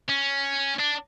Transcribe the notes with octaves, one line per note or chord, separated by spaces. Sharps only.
C#4
D4